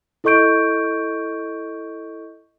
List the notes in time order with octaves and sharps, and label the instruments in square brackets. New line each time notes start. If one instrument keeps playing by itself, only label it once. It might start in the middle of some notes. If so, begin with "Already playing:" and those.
[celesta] E4 A4 D#5 C#6 G6 D7